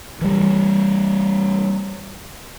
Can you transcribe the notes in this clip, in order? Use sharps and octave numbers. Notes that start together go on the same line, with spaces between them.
E3 G3